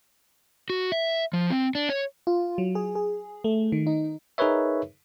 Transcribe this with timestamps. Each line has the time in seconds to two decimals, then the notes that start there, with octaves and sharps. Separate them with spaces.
0.70 F#4
0.92 E5
1.33 F3
1.50 C4
1.75 D4
1.89 C#5
2.27 F4
2.58 F#3
2.75 G#4
2.95 G#4
3.44 A3
3.72 D#3
3.87 D#4
4.38 D#4 G#4 A#4 B4 C#5 E5